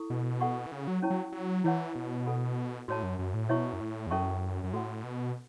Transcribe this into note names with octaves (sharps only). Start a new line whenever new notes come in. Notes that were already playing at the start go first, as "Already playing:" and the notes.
Already playing: E4 A4 C#6
B2
A4 F#5 C#6
E3
C#3
F#3
C#4 E4 C#5 A5 C#6
F#3
F#3
E3 E4 C#5 F#5 C#6
B2
A4 F#5 B5
A2 F#4 C#5 A5
F#2
F#2
A2
B2 E4 C#5 E5 C#6
F#2
A2
E2
F#2 C#4 A4 E5 A5 C#6
F#2
A2 F#4 A4 F#5
B2